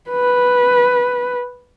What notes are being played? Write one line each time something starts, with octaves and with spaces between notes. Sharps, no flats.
B4